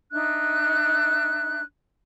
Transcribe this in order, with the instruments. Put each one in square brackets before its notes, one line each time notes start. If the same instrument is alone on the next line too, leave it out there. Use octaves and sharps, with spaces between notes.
[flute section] D4 D#4 E5 F#6